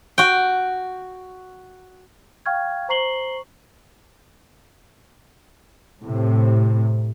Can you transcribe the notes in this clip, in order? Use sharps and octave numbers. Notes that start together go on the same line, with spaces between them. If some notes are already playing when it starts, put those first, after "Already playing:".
F#4 G5
F5 G5 C#6 F6 G#6
C5 A#5 C#6 C7 F#7 G7
A2 C3